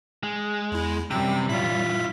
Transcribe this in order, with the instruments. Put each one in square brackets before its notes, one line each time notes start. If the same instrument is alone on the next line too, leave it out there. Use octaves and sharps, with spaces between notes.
[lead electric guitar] G#3
[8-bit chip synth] E2 E4
[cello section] F#2 E3 G3 [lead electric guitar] C3 [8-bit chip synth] G5
[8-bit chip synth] A#2 B6 [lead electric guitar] E4 F4